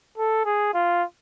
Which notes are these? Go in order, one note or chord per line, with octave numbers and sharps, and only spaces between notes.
A4
G#4
F4